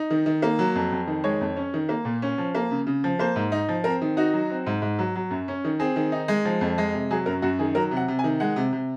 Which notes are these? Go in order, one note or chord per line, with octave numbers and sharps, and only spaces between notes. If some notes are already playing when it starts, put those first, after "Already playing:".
Already playing: D#4
D#3
D#3
A#3
F#3
F2
F2
D#3
G#3 C#5
F2
C#4
D#3
A#3
A#2
C#4
F3
A#3
C#3
C#3
F3
A#3 C5
G#2
D#4
F3
C4 A#4
D#3
D#4 F#4
F#3
C4
G#2
G#2
F#3
F#3
F#2
C#4
D#3
C4 G#4
D#3
D#4
G#3
F3
F2
G#3
C3
F#3 G#4
F#2 A#4
F#2 F#4
D#3 G#4
F#3 A#4
C3
F#5
C3
G#5
D#3
G#3 F#5
C3
C3